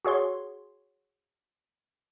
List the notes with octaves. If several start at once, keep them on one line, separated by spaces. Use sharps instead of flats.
F#4 G#4 C#5 C6